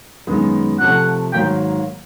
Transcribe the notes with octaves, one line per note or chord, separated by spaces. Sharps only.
F#2 D#3 G#3 B3 D#4
C3 F3 A3 F#5
G#2 D#3 F#3 A#3 G5